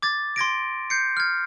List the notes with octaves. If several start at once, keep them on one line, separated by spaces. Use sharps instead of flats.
D6 G#6 A6
C6 G#6 A#6 D7
G6 C7 C#7
F6 G#6